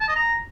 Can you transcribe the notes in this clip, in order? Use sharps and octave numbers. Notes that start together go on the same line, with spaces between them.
A5
D#5
A#5